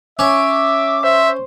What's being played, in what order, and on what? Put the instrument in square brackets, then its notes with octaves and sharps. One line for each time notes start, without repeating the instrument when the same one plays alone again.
[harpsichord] C#4 [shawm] E5 [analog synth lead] D6
[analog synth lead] C5 [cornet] E5